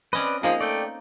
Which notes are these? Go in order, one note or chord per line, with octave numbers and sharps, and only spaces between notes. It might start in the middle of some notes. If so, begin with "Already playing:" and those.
C4 C#4 B4 D5 D#5
F3 A#3 D#4 G#4
A3 D5 G5